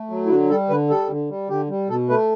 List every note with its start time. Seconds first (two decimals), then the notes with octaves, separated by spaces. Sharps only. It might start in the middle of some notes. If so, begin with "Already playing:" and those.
Already playing: A3
0.10 F#3
0.26 E4
0.30 D3 F#4
0.50 G3 A4
0.69 D3 B4
0.90 G3 A4
1.10 D3
1.29 G3
1.49 D3 G4
1.69 G3
1.89 B2 A4
2.09 A3 B4